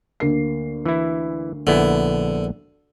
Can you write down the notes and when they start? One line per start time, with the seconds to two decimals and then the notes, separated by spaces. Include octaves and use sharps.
0.20 D2 A#3 C7
0.86 E3 E4
1.67 A#1 D3 B3 E4